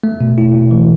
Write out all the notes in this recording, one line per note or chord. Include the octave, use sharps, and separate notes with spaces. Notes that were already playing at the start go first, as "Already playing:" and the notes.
A3
B2
E4
B2
E3